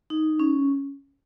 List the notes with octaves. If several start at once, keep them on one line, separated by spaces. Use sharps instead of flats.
D#4
C#4